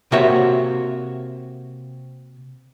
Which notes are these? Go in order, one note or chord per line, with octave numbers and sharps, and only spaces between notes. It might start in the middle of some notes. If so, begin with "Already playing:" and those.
C3 A#3 F#4 C#5 E5